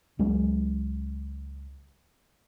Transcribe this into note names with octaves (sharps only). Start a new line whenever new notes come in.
C#2 F#3 G#3 C#4